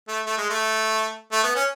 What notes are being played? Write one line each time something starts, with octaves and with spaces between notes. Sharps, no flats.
A3
A3
G#3
A3
A3
B3
C#4